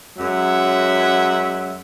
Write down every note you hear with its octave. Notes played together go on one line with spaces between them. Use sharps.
F#2 F#3 G#3 E5 F#5